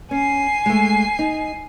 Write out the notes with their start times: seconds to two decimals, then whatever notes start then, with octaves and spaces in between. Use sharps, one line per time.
0.11 C#4 G#5 C7
0.66 G#3 A3
1.19 D#4